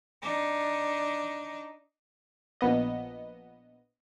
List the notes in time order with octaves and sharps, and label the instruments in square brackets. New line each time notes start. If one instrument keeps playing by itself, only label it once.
[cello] D4 D#4
[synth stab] A#1 B3 D#5